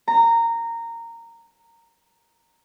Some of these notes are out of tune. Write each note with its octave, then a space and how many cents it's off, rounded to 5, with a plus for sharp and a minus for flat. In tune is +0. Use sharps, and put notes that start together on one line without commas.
A#5 -15